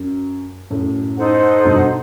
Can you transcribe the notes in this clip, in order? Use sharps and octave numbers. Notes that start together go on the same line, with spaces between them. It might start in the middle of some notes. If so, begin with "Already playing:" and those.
Already playing: F#2
F#2 A2
D#4 A4 C5 F#5
G2 B2